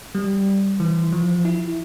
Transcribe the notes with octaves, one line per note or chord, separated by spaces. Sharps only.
G3
E3
F3
E4